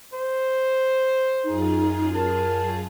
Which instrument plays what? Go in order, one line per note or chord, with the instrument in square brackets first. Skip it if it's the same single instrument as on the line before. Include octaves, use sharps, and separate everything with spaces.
[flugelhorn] C5
[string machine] F#2 F4 G#4 [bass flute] D#4
[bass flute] A#4 [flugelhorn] A5